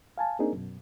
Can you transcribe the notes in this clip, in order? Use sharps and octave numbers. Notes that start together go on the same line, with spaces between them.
F5 G#5 A5
A#3 C4 D4 D#4 G#4 A#4
F#2 B2